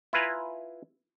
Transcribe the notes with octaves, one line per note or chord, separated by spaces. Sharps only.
E4 F4 B4 G#5 A#5